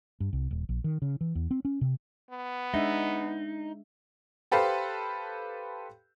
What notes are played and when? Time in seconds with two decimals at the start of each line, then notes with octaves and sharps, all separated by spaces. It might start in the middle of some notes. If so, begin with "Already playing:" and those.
0.20 G2
0.33 C2
0.51 D#1
0.69 A#1
0.84 D#3
1.02 C#3
1.21 E3
1.35 E2
1.51 C4
1.65 C#4
1.81 C3
2.31 B3
2.74 G#3 D4 D#4 E5
4.52 G4 A4 B4 C5 F5